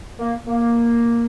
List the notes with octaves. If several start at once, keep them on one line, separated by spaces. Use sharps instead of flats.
A#3
A#3